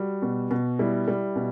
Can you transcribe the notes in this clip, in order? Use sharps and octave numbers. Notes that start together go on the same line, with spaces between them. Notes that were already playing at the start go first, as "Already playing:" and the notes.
Already playing: G3 F#4
B2
B2
G3 E4
G3
B2